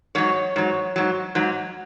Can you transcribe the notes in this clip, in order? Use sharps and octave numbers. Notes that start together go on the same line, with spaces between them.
G#2 F#3 C#5
G#2 F#3
G#2 F#3
G#2 F#3